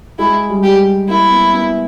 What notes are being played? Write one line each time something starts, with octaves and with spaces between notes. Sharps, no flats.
G#3 E4
G3
G4
G3
A#3 E4
B3
B3